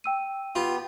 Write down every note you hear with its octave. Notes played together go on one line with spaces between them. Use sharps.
G5 E6 D#7
B3 F4 G4